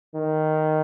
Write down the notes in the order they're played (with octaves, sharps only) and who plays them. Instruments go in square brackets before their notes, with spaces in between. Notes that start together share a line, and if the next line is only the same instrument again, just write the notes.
[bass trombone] D#3